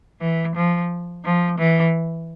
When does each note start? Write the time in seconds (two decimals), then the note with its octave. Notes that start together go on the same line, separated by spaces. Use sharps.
0.21 E3
0.56 F3
1.25 F3
1.58 E3